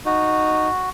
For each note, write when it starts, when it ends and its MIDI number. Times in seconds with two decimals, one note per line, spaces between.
0.06 0.69 63
0.06 0.90 66